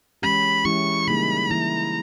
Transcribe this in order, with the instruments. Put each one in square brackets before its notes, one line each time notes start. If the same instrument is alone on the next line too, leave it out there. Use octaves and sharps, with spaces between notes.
[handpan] E3 G#3 C#4 G4 [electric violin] B5
[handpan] E3 G#3 C#4 E4 G4 [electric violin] C#6
[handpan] C#3 G3 A#3 D#4 G#4 [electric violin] B5
[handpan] E3 A#3 E4 [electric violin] A#5